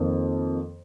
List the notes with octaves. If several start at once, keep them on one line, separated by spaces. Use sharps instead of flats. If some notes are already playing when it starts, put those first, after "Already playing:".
Already playing: F2 D#3 A#3